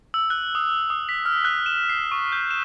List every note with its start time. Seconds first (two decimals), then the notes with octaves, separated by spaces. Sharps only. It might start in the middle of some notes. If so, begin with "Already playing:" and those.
0.14 E6
0.30 F#6
0.55 D#6
0.90 D#6
1.09 B6
1.26 F6
1.45 F#6
1.66 E7
1.89 C7
2.11 C#6
2.32 G6
2.51 E7